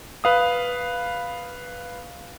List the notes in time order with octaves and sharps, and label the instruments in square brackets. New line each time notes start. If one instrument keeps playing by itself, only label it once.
[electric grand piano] B4 F5 D#6